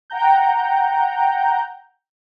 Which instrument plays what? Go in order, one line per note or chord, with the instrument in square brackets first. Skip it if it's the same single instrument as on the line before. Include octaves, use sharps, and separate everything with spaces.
[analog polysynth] F#5 G5 A#5 G6